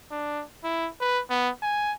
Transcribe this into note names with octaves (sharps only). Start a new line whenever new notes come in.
D4
E4
B4
B3
G#5